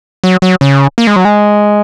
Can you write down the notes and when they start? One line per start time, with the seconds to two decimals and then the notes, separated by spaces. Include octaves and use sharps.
0.24 F#3
0.42 F#3
0.61 C#3
0.98 A#3
1.07 G#3
1.16 F#3
1.25 G#3